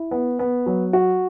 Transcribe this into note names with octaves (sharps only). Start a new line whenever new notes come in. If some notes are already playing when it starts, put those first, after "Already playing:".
Already playing: E4
B3
B3
F#3
F#4